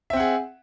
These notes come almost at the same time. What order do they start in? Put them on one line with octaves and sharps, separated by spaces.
E5 C4 F#5 G#4